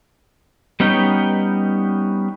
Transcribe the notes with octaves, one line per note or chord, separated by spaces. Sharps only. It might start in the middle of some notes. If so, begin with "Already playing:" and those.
G3 B3 C#4 D#4 G5